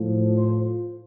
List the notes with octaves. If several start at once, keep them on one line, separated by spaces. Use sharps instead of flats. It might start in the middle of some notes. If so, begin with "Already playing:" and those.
Already playing: A2 F3
C5